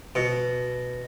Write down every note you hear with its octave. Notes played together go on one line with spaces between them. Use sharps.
B2